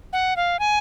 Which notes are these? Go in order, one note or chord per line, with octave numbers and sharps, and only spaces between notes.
F#5
F5
G#5